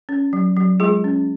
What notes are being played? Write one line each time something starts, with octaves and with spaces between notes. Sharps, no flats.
C#4
F#3
F#3
G#3 F4 G#4
C#4